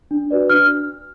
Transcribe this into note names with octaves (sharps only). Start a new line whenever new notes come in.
D4
F#4 B4 D5
D4 F6